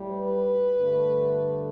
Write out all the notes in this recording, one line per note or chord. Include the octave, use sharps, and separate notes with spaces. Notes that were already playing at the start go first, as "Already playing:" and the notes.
Already playing: A2 G3
B4
G2 D3 A3